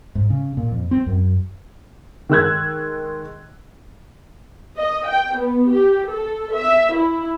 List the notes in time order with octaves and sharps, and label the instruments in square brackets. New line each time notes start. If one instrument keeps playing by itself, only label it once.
[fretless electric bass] G#2
C#3
A#2
F2
C4
F#2
[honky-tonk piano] D#3 G#3 E6 F#6 G#6
[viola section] D#5
G5
B3
G4
A4
E5
E4